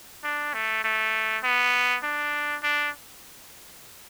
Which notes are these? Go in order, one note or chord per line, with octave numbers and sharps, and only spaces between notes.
D4
A3
A3
B3
D4
D4